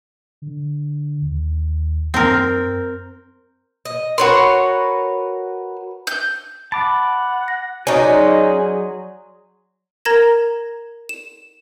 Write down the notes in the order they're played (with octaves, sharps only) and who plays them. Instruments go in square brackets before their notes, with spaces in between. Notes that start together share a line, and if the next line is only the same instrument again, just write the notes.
[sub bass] D3
D#2
[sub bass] F#2 [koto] C4 A#4
[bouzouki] D#5
[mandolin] F#4 B4 C6 [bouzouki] A#4 C#5
[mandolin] G6
[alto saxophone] F#5 [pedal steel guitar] A5 D6 [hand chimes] B5
[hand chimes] A#6
[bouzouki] C#4 D#4 [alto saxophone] F#4 [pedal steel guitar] D5 G#5
[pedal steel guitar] F#3 C6 F#6 [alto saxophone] G#4 [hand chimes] D5
[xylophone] A#4 A#5 G#6 A#6 E7
E7